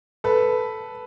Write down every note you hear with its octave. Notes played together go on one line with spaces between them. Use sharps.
A4 B4